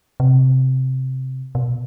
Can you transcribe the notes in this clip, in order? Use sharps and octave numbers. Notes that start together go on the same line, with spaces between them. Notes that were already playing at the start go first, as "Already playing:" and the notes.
C3
B2